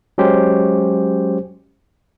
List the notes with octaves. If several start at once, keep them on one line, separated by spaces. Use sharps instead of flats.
F#3 G#3 C#4 G4 C5